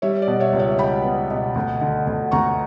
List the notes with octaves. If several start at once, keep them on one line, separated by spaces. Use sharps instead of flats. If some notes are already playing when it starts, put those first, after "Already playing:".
G3 C#5 E5
D5
B2
C#5 E5
C#2
C#5 E5
C#2 G5 B5
B3
B2
D2
D3
D2
D2 A#5 C#6